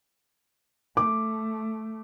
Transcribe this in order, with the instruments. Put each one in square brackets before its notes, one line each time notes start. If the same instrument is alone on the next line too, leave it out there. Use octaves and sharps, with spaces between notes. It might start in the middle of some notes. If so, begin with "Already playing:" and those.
[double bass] A3 [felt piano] D6